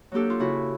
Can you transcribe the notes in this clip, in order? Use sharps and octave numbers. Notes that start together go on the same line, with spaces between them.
F#3 A#3 D4 G4 A4
F4
C#3 E4 F#4